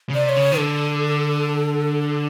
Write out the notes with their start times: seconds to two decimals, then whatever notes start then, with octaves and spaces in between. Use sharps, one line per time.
0.09 C#3
0.14 C3 D5
0.25 D5
0.29 C#5
0.37 C#3
0.52 D#3
0.58 D3 A4